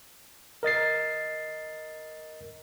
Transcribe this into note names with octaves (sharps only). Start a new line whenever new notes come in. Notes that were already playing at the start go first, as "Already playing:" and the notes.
A#4 D#5 A6 C7